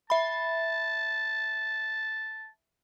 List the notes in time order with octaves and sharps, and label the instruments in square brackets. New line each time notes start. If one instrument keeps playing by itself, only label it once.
[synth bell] E5 B5 [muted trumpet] A5